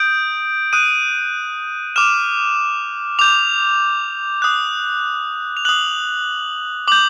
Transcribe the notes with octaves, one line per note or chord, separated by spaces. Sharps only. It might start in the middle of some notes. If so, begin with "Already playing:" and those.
Already playing: D#6 G6 D7
D#6 F#6 D#7
D6 F6 E7
D6 G6 F7
D#6 F#6
F7
D#6 F#6 F#7
D6 G6 F#7